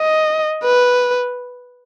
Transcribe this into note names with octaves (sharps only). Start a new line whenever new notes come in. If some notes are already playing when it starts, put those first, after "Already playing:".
Already playing: D#5
B4